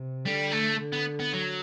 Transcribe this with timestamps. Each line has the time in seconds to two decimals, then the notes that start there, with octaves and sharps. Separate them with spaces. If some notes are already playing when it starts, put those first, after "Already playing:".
Already playing: C3
0.25 D3 G3
0.52 A3
0.80 D3
0.93 B3
1.20 B3
1.33 F#3